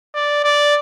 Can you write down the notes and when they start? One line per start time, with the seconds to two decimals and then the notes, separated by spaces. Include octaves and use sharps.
0.15 D5
0.44 D5